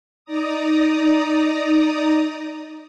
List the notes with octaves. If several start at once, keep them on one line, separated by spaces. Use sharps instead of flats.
D#4 D5 A#5 D#6